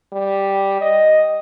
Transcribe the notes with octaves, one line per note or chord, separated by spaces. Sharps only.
G3
D#5